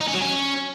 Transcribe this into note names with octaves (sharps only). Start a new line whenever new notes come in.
D#4
C#4
F#3
C#4